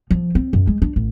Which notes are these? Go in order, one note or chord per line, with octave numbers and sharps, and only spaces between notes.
F3
C4
F#2
G#3
D4
A1